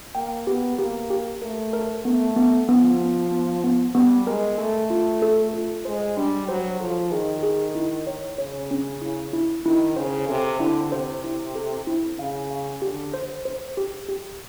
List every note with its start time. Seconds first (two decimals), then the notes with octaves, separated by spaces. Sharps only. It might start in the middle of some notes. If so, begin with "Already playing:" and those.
0.15 A#3 G5
0.47 B3 G4
0.79 A#3 G4
1.10 G4
1.42 A3 A#4
1.73 A#4
2.05 A3 B3
2.36 B3
2.69 F3 B3
3.01 B3
3.32 B3
3.64 B3
3.95 G3 B3
4.27 G#3 A#4
4.58 A3 A4
4.90 F4
5.22 A4
5.54 F4
5.85 G#3 C5
6.17 G3 D4
6.48 F#3 C5
6.80 F3 A4
7.12 D#3 G#4
7.43 G#4
7.75 E4
8.07 C#5
8.38 C#3 C#5
8.71 C#4
9.01 E4
9.33 E4
9.65 D#3 E4
9.96 C#3 C5
10.29 C3 A4
10.60 D3 E4
10.92 C3 C5
11.24 E4
11.55 A4
11.87 E4
12.18 C#3 F5
12.51 F5
12.82 D3 G4
13.14 C5
13.45 C5
13.77 G4
14.09 G4